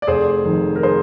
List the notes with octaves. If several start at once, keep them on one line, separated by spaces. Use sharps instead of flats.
D5
F1 G#4 C5
F2 D#3
A#4
G#4 C5